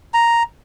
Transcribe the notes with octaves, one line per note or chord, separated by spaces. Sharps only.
A#5